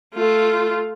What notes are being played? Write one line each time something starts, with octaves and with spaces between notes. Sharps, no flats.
A3 F4